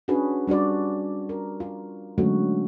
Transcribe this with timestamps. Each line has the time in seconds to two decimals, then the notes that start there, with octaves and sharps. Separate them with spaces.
0.08 C#4 D4 F#4 G#4 B4
0.47 G3 D4 F#4 D5
1.29 A#4
1.60 F4
2.18 D3 F#3 G#3 A3 C#4 F#4